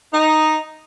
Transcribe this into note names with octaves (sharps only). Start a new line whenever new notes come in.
D#4